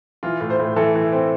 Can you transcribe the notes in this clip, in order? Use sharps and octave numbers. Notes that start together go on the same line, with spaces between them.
E3 F4
A2
C5
A2
E3 A4
E3
C4